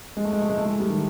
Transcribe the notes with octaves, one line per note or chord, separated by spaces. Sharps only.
G#3
A3
G#3
A3
G#3
A3
G#3
G3
D#3